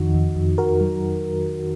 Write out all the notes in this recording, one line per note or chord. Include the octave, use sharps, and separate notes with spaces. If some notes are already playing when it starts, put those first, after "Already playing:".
Already playing: F2 D#3 D#4 F#4
F2
F2
F2 F#4 A#4
F#3